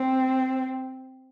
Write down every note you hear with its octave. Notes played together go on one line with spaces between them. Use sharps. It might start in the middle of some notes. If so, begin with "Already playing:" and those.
Already playing: C4